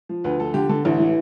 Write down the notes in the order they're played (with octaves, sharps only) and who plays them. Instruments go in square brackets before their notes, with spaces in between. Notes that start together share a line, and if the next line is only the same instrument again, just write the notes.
[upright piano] F3
D2 B4
F3 A4
D3 G4
D3 A4
A1 E4
E3